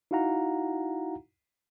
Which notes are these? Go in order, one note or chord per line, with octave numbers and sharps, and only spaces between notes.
D#4 E4 F#4 F5 F#5 A#5